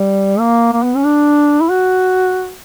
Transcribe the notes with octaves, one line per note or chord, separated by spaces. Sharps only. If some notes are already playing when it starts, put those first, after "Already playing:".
Already playing: G3
A#3
A#3
B3
C#4
D4
E4
F#4